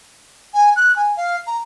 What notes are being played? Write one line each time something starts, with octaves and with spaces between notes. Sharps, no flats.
G#5
F#6
G#5
F5
A#5